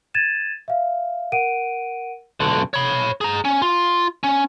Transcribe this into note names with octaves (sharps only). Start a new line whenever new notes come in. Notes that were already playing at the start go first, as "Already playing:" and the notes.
G#6 A6 D#7 E7
E5 F5
A#4 F#5 D7 D#7
B1 D3
C#5 B5
G#4 A#5
C#4
F4
C#4